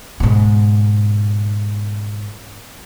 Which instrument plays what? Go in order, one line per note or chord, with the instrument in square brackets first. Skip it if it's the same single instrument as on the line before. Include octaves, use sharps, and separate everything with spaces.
[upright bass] G#2 B2